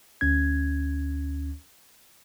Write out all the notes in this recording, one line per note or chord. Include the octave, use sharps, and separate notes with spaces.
D2 C#4 G#6